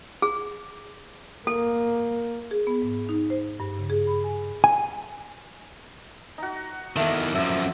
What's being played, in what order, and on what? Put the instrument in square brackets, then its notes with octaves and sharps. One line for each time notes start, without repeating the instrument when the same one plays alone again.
[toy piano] G#4
[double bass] A#3 [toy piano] A4
[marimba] G#4
B3
G#2
D#4
C5
G2
C#3
G#4
B5
G#5
[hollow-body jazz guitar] G#5
[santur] D#4 F#4
[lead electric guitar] E2 D#3 [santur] A3
[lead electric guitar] F#2 F3 [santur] E5